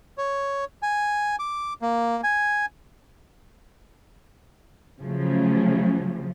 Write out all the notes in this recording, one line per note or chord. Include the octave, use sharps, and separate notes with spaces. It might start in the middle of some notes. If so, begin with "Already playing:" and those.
C#5
G#5
D6
A#3
G#5
C#3 F3 F#3 A3 C#4